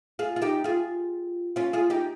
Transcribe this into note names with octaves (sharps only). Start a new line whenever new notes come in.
F4 G#4
F4
D#4 G4
F4 G#4
C#4 F4
F4 G#4
D#4 G4